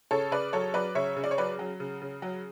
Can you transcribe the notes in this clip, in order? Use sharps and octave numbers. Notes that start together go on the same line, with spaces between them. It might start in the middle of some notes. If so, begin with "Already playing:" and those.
C#3 A4 C#5
C#3 B4 D5
F#3 A4 C#5
F#3 B4 D5
C#3 C#5 E5
C#3
D5
C#5
F#3 B4 D5
F#3
C#3
C#3
F#3